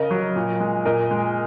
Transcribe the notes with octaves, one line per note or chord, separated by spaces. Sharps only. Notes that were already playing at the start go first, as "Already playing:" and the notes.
Already playing: C#3 A#4 D#5
F#3
A#2
G#3
A#2 A#4 D#5
G#3